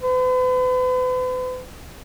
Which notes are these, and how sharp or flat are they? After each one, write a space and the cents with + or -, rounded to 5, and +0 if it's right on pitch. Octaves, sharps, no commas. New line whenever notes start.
B4 +40